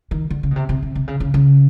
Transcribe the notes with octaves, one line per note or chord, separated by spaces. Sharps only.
D#3
D3
C#3
B2
C3
C3
C3
C3
C#3
C#3
C#3